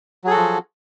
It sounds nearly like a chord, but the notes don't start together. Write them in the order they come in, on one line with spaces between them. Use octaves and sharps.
F#3 G#4 A4 F#4 F3